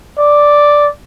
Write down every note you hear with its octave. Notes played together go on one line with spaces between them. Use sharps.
D5